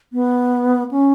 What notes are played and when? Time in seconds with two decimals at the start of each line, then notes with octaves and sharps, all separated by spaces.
0.13 B3
0.91 C#4